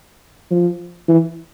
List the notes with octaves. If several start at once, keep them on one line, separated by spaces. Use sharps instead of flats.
F3
E3